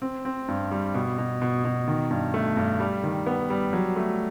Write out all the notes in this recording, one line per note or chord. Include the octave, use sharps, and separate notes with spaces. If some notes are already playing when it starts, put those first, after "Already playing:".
C4
C4
G2
G3
B2
B2
B2
B2
D#3
G2
A3
G2
G3
D#3
B3
G3
F#3
A3